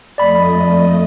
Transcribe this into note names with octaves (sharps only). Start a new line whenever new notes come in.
F2 A3 D5 D#5 B5